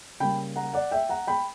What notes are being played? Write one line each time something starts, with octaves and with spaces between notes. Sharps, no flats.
C#3 G3 A#3 G5 B5
F#5 A#5
D5 F#5
E5 G5
F#5 A#5
G5 B5